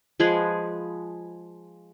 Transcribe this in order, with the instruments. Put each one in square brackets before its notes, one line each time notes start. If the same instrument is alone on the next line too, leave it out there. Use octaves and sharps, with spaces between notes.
[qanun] F3 G#3 G#4 B4